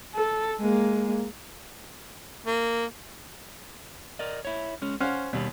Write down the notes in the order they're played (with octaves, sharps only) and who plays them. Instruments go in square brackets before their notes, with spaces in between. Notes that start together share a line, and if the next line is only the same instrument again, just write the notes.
[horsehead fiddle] A4
G#3 A#3
[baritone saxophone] A#3
[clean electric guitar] A#4 D5 D#5
E4 C#5
G#3 C#4
[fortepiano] C#4 F5 F#5 [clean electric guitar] C5
[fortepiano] D#2 [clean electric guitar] B2 G3